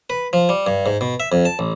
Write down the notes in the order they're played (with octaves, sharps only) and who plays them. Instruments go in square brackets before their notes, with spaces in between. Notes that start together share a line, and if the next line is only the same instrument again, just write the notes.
[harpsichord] B4
F3
G3
G2
G#2
B2
E5
F2
A5
A1